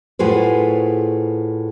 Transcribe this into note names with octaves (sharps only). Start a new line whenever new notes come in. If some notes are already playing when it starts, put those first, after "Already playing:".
A2 F4 F#4 G#4 B4 C5